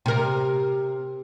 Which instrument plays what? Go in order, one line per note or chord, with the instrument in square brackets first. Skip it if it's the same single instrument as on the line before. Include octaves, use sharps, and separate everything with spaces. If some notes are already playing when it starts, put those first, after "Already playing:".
[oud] C3 A#4